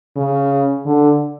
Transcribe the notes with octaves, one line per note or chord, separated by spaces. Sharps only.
C#3
D3